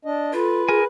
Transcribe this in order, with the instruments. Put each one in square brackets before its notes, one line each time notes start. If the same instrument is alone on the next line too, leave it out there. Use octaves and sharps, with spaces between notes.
[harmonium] D4 D#5
[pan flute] F4 [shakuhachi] A4 [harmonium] B4
[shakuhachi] G#4 [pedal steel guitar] A#4 G#5